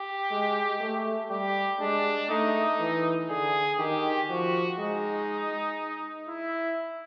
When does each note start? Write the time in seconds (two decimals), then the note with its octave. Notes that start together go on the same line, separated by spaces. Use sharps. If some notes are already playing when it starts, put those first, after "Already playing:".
Already playing: G4
0.31 G#3
0.80 A3
1.30 G3 G4
1.80 G#3 D4
2.29 A3 D#4
2.79 E3
3.29 D3 G#4
3.79 D#3 G4
4.29 F3 F#4
4.79 G#3 D#4
6.28 E4